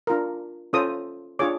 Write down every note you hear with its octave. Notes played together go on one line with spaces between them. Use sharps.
D4 F4 A#4
C#4 F4 A4 C5 D#6
D4 F4 G#4 C#5 D6